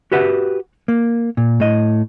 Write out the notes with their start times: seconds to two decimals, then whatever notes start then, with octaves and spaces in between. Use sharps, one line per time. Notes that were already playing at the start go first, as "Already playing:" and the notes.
0.12 F#4 G4 B4 E5 F#5
0.88 A#3
1.37 A#2
1.60 A2 D#5